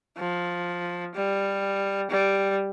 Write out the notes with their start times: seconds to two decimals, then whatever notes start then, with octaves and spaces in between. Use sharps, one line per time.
0.18 F3
1.15 G3
2.10 G3